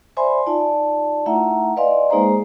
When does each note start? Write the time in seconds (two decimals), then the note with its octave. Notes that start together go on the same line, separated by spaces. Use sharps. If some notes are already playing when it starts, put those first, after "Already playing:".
0.17 C5 D5 E5 G#5 B5 C6
0.46 D#4 F4 D5 A5
1.26 A3 D#4 E4 E5 F#5 A#5
1.77 B4 D5 D#5 F5 G#5 C6
2.10 G#3 A#3 D#4 G#4 C5 A#5